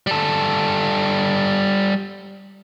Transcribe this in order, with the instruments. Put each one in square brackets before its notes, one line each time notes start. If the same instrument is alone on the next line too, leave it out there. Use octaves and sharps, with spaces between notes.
[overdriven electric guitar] G3 A4